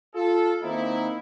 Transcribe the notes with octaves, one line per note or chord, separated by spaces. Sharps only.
F4 A4
D#3 A#3 C4 D#4 E4